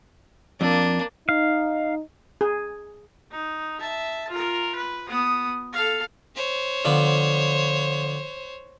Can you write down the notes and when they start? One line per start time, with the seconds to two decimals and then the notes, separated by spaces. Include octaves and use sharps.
0.61 F2 A#3 D4
1.29 D#4 F5
2.41 G#4
3.31 D#4
3.81 E5 A5
4.30 F4 A#4
4.75 B4
5.08 B3 D#6
5.73 A4 F5
6.35 C5 C#5
6.85 D3 F3 B3